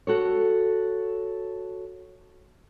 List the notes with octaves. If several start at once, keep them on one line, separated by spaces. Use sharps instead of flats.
F#4 A4 C#5